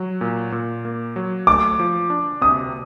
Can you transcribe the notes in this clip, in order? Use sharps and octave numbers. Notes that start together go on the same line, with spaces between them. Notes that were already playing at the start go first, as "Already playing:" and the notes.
Already playing: F#3
A#2
A#2
A#3
F#3
A3 D6
F3
D4
C3 D#6